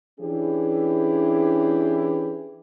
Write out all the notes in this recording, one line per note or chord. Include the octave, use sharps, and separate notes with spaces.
E3 C#4 D4 E4 G4 G#4